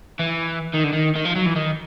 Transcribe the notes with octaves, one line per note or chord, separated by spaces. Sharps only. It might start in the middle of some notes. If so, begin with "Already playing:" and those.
E3
D#3
D3
D#3
D#3
F3
F#3
E3
D#3